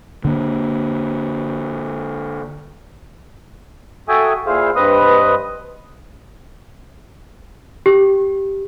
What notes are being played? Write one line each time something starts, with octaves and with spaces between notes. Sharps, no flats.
D3 A#3
F#4 A4 E5 G5 G#5 D#6
A#2 E4 G#4 C5 F5
G2 C4 B4 D#5 D#6
G4